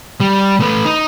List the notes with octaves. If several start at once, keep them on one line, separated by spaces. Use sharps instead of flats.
G3
A3 B4
D#4